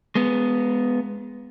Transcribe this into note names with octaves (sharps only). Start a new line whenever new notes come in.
G#3 B3